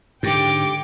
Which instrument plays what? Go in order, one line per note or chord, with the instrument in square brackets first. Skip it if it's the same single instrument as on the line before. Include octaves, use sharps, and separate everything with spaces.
[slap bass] G#2 D3 [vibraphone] G4 [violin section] G5 D6